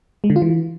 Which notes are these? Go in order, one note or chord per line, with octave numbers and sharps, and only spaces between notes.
G#3
D3
F4
E3